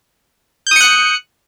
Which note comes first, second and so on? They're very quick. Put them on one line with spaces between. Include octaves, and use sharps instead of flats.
G6 D#6 C#7 F#6